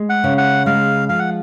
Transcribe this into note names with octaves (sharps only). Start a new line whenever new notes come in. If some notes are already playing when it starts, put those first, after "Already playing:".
Already playing: G#3
F#5
C#3
F#5
G#3 F5
F3 F5
F#5